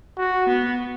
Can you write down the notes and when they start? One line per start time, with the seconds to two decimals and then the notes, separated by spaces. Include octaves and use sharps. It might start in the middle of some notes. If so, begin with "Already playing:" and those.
0.17 F#4
0.47 B3